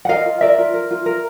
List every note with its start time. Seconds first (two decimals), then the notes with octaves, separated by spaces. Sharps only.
0.05 F#5
0.09 A#4 D#5 F5
0.26 F4
0.41 A#4 D5 E5
0.58 F4
0.74 A#4
0.91 F4
1.06 A#4